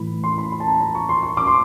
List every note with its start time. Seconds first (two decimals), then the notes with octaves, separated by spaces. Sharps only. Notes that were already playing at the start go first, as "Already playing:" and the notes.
Already playing: A2 E3 B5
0.24 C6
0.38 B5
0.52 B5
0.60 A5
0.67 A#5
0.81 A#5
0.95 C#6
1.09 C6
1.23 C#6
1.37 D6
1.47 C6